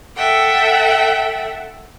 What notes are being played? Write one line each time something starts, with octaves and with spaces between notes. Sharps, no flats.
A4 E5 F#5 G5